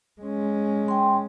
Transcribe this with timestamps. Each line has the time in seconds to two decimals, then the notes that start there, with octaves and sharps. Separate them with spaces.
0.21 G#3 C#4
0.88 G5 C6